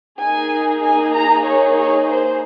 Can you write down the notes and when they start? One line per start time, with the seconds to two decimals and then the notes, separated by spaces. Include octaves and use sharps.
0.20 A#3 D#4 G#4 G#5
0.83 G#5
1.14 A#5
1.46 C#5
1.77 C#5
2.08 C5